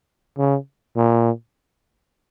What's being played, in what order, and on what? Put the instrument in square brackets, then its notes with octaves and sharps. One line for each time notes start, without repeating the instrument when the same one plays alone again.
[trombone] C#3
A#2